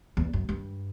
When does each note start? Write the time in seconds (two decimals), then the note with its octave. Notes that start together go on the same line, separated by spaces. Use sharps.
0.17 E2
0.33 F#2
0.49 G2